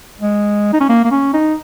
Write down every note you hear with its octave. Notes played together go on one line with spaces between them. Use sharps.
G#3
D#4
C#4
A#3
A#3
C#4
D#4